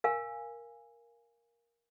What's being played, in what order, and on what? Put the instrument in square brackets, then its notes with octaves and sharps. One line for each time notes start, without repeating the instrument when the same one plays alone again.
[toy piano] A#4 F5 G#5